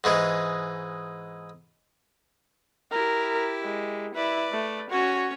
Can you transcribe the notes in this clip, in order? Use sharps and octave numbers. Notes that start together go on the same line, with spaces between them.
G#2 E3 G#3
E4 G4 A#4
G#3
E4 B4 D5
A3
C#4 F#4 C#5